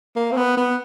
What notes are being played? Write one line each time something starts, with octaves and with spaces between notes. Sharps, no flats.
A#3
C4
B3
B3